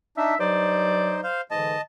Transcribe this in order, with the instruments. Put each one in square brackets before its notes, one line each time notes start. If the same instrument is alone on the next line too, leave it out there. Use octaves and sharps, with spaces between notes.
[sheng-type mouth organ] D4 D#4 [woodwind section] E5
[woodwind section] G2 F#3 D5 [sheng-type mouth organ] D#4 C5
[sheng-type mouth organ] C5 F5
[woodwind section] G#2 D3 E3 [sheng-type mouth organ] D#5 A5